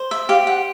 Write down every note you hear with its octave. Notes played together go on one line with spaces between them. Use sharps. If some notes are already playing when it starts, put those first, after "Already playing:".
Already playing: C5
E5
G4 F5
F#5